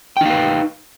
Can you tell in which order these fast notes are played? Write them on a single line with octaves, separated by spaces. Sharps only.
G5 D#4 F5 B4